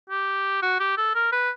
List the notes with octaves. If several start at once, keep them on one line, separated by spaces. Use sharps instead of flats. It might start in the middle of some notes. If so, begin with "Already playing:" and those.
G4
F#4
G4
A4
A#4
B4